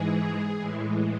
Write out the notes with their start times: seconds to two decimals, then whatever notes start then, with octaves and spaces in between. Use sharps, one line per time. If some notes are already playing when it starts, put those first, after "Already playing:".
Already playing: G#2 E3 G#3 G#4
0.58 A2 E3 G#3